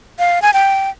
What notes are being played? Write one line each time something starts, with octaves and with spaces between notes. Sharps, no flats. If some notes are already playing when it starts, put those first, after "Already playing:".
F5
G#5
G5